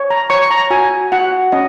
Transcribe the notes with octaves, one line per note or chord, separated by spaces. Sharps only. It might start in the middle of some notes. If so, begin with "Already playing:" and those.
Already playing: C#5
A#5
C#5 C#6
A#5
F#4 G#5
F#4 F#5
C#4 D#5